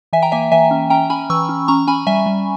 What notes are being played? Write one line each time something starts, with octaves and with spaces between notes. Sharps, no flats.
E3 E5 G#5
G5 A#5
A#3 E5 G#5
E3 E5 G#5
C#4
C#4 G5 A#5
C#4 G#5 B5
E3 C#6 E6
C#4
C#4 A#5 C#6
C#4 G#5 B5
G3 E5 G#5
G3